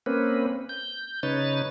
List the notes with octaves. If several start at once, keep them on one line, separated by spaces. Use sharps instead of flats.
A#3 C4 C#4 B4
G6
C#3 D#4 B4 C#5 A6